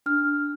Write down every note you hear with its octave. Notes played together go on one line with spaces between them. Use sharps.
D4 F6